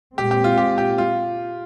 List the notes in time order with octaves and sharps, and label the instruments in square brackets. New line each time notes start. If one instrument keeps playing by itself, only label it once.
[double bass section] A#2 G#3 C4 [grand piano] G4
[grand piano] G4
F4
G4
G4
F4